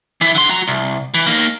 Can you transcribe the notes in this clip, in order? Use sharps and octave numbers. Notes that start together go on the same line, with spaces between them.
E3 E4
D3 C6
F#4 A#5
C2
E3
A#3 D#4